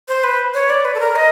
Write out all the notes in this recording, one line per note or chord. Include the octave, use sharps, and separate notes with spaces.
C5
B4
C#5
D5
B4
A4
A#4
D#5